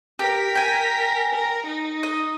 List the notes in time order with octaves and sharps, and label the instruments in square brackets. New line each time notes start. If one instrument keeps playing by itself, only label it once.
[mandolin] G4 [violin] A#4 B6
[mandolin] G5 G#5
[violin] A#4
D#4
[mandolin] D#5